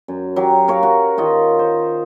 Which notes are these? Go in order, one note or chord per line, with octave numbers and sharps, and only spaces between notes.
F#2
F#3 G4
A#4 C#5 F5
F#4
D#3 F4 D#5
C5